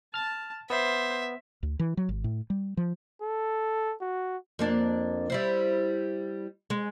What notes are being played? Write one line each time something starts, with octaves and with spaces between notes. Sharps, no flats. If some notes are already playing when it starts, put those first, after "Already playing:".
A5 F6 A6
B3 C5 E5
D2
E3
F#3
G#1
A2
G3
F3
A4
F#4
F2 A#3 D4
G3 E4 C5
G#3